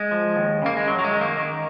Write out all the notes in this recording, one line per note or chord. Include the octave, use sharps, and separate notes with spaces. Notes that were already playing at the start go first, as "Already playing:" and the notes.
Already playing: G#3
F3
D#2
C#3 A#3
G#3
F#2 F#3
F#3
G#3
D#3
A#3
D#3